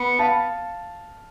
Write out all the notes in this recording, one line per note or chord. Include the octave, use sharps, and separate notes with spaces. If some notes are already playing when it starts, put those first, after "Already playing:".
Already playing: B3
F5 A5